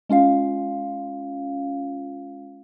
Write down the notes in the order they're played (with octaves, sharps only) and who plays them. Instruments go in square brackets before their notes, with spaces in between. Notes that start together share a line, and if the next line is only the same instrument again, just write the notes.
[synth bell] G#3 C#4 F4 F5